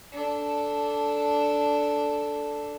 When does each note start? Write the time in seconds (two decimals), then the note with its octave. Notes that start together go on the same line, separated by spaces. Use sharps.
0.12 D4 A4